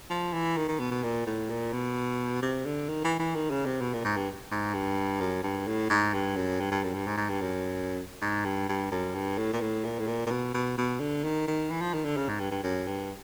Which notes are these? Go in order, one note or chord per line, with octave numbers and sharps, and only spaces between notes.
F3
E3
D#3
D#3
B2
B2
A#2
A2
A#2
B2
C3
D3
D#3
E3
E3
D#3
C#3
C3
B2
A#2
G#2
G2
G#2
G2
F#2
G2
A2
G#2
G2
F#2
G2
G2
F#2
G2
G#2
G#2
G2
F#2
G#2
G2
G2
F#2
G2
A2
A#2
A2
A#2
A2
A#2
A#2
B2
B2
B2
D3
D#3
D#3
E3
F3
D#3
D3
C#3
G#2
G2
G2
F#2
G2